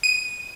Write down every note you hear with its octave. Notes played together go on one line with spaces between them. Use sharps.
D#7